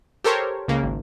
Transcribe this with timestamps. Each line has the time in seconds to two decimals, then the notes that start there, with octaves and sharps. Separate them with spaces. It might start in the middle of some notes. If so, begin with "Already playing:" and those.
0.24 G4 A4 A#4 C5 C#5
0.68 C#2 C#3 A#3
0.83 G#1